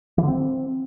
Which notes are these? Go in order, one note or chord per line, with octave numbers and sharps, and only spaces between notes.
E3
D3
C4